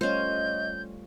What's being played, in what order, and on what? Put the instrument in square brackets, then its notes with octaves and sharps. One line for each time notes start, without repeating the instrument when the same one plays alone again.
[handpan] G3 A3 F4 [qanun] C#4 C5 [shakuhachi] D#5 [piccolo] G6